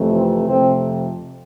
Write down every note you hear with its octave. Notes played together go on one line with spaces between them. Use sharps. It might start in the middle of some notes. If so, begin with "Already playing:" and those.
Already playing: F2 C3 E3 A3
C4
F2 C3 F3 A3 C4